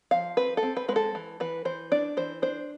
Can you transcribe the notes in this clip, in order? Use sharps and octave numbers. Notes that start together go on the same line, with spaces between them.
F3 F5
C4 B4
A4
C4
B4
G#3 B4
A4
E3
E3 B4
E3 C5
D4 D5
E3 C5
D4 C5